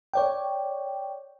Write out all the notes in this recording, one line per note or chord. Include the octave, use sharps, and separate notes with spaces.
C#5 D5 G5